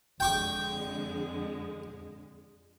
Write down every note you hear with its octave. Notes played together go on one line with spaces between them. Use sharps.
F2 D3 G#3 G5 C#6 D6